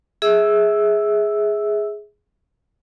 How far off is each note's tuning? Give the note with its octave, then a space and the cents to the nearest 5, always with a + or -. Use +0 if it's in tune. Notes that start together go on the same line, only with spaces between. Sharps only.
G#4 +5 E5 -25 E6 +0